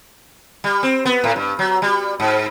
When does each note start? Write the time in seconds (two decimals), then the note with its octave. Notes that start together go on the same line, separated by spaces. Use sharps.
0.64 G3
0.83 C4
1.05 B3
1.24 A2
1.36 G2
1.59 F#3
1.82 G3
2.20 G#2